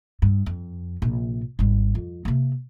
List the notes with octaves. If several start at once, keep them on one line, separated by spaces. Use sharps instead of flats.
G2
F2
A#1 C3
G#1 G3
F2
C3 A#3